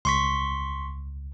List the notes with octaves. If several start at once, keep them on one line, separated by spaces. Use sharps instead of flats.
C#2 C6 C#6 B6